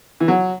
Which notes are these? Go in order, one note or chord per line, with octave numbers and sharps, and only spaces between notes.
E3
F#3